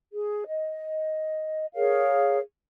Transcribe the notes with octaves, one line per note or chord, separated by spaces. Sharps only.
G#4
D#5
G#4 A#4 C#5 F5